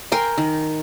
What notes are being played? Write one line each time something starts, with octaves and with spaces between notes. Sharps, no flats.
A#4 G5 G#5 C6
D#3